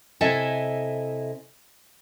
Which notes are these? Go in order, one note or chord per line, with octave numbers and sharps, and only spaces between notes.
C3 E4 A4 D#5 E5 G#5